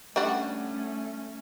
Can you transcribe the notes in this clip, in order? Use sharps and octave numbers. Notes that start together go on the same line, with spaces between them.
G3 A3 C#4 D4 F#4